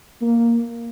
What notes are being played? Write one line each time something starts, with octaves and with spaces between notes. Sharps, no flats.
A#3